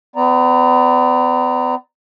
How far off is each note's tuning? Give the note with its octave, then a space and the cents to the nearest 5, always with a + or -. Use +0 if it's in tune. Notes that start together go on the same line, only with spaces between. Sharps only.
B3 +40 D5 +0 A#5 +0